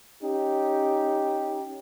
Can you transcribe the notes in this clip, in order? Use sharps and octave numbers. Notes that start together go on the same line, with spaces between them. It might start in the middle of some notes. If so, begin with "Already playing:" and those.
C#4 D#4 G4